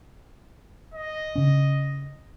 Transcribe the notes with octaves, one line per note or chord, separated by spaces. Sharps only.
D#5
C#3 C#4